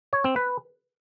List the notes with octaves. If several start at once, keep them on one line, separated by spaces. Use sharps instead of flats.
C#5
C4
B4